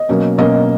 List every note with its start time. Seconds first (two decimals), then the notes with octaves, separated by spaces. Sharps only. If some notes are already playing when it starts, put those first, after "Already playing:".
Already playing: D#5
0.09 B2 F#3 A#3 C#4
0.38 B2 F#3 A#3 C#4 D#5